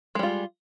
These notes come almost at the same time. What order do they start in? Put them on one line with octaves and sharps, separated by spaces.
G#3 G3 F4